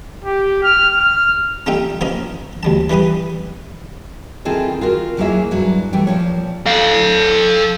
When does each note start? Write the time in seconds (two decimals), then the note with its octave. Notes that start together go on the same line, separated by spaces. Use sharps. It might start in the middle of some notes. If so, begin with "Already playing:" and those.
0.24 G4
0.63 F6
0.98 F6
1.66 G3 A3 D#4 F4 E5 G5
2.01 F3 A#3 C#4 A#4 D#5
2.63 D2 G3 A5
2.90 E3 G3 B4 B5 D#6
4.45 D#3 C4 E4 F4 G#4 A4
4.81 F4 F#4 A#4
5.17 D#2 F#3 A#3 E4 G#4 E5
5.51 G2 F#3 E4
5.93 E3 G3 A3 G5
6.07 A#2 F3 C#5
6.66 A4 F5